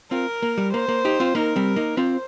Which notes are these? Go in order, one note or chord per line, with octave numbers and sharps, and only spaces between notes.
C4 F4 A#4
A#3
G3
A#3 C5
A#3
D#4 G4
C4 F4
A#3 D#4 A#4
G3 C4
A#3 D#4
C4 F4 C5